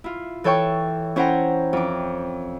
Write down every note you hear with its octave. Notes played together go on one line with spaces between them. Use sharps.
E4 F4
E3 A4 C#5 G5 C#6
C#4 E4 C5 F#5 G5 A#5
F2 D6